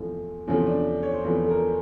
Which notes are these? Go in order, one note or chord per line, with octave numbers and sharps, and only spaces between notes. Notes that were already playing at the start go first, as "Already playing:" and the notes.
Already playing: E2 C3 F3 A3
E2 C3 F3 A3 C#4
D4
C#5
C5
E2 C3 F3 A3 B4
A4
A#4